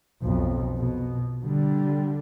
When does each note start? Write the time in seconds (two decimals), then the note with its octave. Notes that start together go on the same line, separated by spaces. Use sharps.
0.22 B1 F2
0.78 B2
1.44 D3 G3